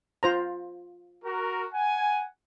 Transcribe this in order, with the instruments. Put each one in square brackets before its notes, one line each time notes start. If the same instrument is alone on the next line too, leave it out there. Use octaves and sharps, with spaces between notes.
[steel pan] F4 C5 A#5
[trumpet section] F#4 A#4
F#5 G#5